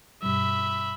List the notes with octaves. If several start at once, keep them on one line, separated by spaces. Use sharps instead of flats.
G2 B2 G3 E5 B5